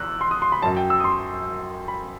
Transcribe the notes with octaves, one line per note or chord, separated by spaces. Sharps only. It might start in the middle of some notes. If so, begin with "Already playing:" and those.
Already playing: E2 E6 F#6
C6
D#6
C6
B5
F#2 F#3 A5
G5
E6
D#6
C6
B5